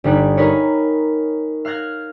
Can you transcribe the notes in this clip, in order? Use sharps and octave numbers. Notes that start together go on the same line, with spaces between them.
G1 G3 D#4 F#6 G#6
D#4 G#4 A#4 B4 C#5
F5 F6 F#6 G#6 A#6